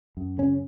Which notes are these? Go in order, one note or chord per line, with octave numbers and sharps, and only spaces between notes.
F#2
C#3 C#4